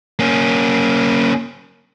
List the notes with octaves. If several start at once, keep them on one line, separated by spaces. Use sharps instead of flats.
A#3 C#4